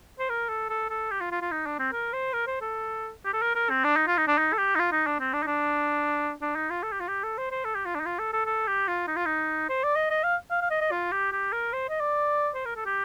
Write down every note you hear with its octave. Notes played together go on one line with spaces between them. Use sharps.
C5
A#4
A4
A4
A4
G4
F4
F4
F4
D#4
D4
C4
A#4
C5
A#4
C5
A4
G4
A4
A#4
A#4
C4
D4
D#4
F4
D#4
D4
D#4
A4
G4
D#4
F4
D#4
D4
C4
D4
D#4
D4
D4
D#4
F4
A4
G4
F4
G4
A4
C5
C5
A4
G4
F4
D4
D#4
F4
A4
A4
A4
G4
F4
D#4
F4
D#4
C5
D5
D#5
D#5
F5
F5
F5
D#5
D#5
F4
G4
G4
A#4
C5
D#5
D5
C5
A#4
A4
G4